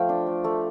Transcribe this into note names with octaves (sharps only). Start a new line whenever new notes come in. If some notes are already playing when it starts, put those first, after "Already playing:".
Already playing: F3 A3 F5 G5
D4
A3
A3